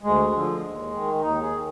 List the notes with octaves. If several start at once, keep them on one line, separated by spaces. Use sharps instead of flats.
D2 G#3
D3 F3
D#2
D#3
D#2 D#4
G#4
D#3